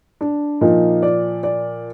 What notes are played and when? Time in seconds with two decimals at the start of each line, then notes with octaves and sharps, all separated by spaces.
0.21 D4
0.61 A#2 F3 D#4
1.03 D5
1.43 D5